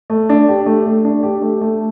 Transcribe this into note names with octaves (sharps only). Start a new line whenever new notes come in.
A3
D4
G4
A3
A3
D4
G4
A3
A3